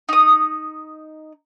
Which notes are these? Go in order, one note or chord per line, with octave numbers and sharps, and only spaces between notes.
D#4 D#6